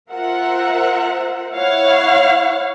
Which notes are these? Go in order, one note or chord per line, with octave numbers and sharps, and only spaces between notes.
F4 A#4 C5 E5 F#5
E4 C#5 F5 F#5